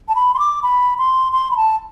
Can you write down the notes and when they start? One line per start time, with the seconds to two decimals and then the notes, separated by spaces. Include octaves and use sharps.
0.09 A5
0.16 B5
0.34 C6
0.39 D6
0.63 B5
0.98 C6
1.33 C6
1.51 B5
1.57 A5